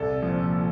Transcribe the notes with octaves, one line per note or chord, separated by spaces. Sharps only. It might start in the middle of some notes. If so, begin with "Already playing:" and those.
Already playing: C2 A4
A#2 F3